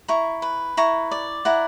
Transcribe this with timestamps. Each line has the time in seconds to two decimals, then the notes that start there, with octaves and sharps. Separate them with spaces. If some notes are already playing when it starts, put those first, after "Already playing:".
0.08 E4 A#5 C#6
0.42 B4
0.77 E4 A#5 C#6
1.11 D5
1.45 E4 F#5 A#5